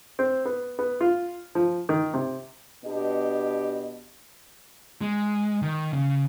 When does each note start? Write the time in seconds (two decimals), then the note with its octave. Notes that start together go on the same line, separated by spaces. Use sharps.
0.19 C4
0.45 B3
0.79 B3
1.01 F4
1.55 F3
1.89 D#3
2.14 C3
2.85 B2 B3 D4 G4 D#5
5.01 G#3
5.62 D#3
5.93 C#3